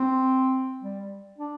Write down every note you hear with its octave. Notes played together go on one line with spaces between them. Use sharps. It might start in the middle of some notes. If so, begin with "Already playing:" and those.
Already playing: C4
G3
D4